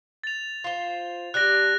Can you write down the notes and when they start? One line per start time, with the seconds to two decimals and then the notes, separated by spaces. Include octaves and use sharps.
0.24 A6 F7
0.64 F4 C5
1.34 G3 D4 G4 F#6 A#6